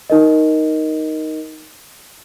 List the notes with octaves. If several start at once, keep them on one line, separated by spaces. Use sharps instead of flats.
D#4 A#4 D#5